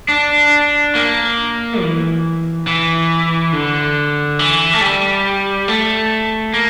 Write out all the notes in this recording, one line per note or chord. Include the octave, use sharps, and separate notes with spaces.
D4
A#3
E3
E3
D3
E3
A3
G3
A3
A#3